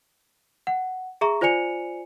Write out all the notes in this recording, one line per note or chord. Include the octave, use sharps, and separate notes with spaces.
F#5
G#4 E5 A#5 C#6
F4 C5 D5 G#5 C#7 F7